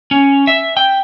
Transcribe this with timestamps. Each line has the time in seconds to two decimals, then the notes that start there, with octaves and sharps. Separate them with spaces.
0.11 C#4
0.47 E5
0.77 G5